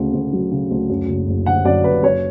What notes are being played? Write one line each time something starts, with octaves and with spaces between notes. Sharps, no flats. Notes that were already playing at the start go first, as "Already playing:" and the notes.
Already playing: D2 C#3
D2
F#3
C#3
D2
F#2
F#1
F#1
D3 F#5
F#2 D5
F#1 B4
F#2 C#5